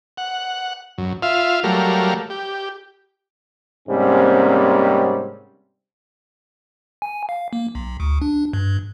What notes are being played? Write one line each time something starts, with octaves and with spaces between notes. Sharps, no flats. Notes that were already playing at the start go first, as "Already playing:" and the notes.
F#5
F#2
F4 E5 F5
F#3 G3 A3 A#4 F5
G4
G#2 C3 G3 A#3 C4 C#4
G#5
F5
A#3
B1
D2
D4
G2